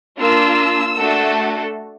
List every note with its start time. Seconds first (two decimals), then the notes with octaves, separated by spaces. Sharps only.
0.18 A#3 D4 F4 E6
0.97 A3 D4 F#4 A4